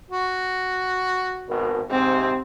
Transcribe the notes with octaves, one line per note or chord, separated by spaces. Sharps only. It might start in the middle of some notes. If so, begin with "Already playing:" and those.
F#4
G#1 B2 A#4
G#2 C3 C4